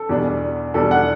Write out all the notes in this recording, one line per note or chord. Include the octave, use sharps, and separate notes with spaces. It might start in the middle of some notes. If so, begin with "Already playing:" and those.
Already playing: A4
E2 B2 G3 D4
E2 B2 G3 D4 A4
F#5